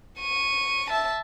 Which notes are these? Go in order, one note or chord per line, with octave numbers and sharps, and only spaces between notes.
C#6 D#7
E5 A5